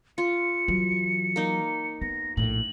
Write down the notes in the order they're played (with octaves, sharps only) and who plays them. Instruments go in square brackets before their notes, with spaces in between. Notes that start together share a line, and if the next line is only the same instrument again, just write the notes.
[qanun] F4 [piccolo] C#7
[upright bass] E3 F#3
[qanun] A#3 D#4
[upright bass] B3 [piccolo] A#6
[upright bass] A#1 A2 [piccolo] F#7